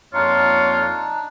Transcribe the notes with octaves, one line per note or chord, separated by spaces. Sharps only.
F2 A#3 D4 D#4 F4 C#5